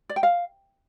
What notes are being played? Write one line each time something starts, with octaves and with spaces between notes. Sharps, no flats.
D5
G5
F5